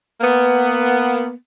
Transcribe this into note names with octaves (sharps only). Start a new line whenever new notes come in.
A#3 B3